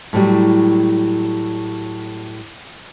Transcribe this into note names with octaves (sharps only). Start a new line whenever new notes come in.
A2 F#3 G3